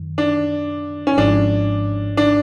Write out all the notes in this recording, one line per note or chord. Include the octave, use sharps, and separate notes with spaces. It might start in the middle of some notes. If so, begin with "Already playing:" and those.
Already playing: F#2 D#3
D4
C#4
G#1 G#2 F3 G#3 D4
D4